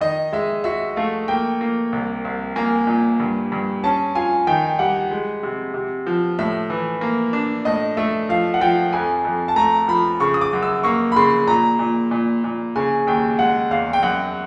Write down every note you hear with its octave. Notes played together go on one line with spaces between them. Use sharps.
D#3 D#5
G#3 E5
F#4 E5
A3 F5
A#3 G5
A#3
C2
C2
A#3 G#5
A#2
G2
G2
C#4 A5
F4 G#5
D#3 G5
G3 F#5
G#3
C3
C3
F3
A2 E5
E3
A#3
D4
A2 D#5
A3 E5
F3 F5
F#5
F3 G5
F2 G#5
F2
A5
A3 A#5
F3 B5
C#3 C#6
D#6
D6
F#2
E6
A#3 C#6
B5
C#3 C6
A#2 A#5
A#2
A#2
A#2
C#3 G#5
D#2 G5
G#3 F#5
E2 F5
G5
F#2 F#5